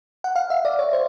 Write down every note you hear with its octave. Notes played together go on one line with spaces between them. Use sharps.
F#5
F5
E5
D5
C#5
C5